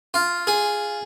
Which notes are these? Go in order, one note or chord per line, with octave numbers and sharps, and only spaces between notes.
F4
G#4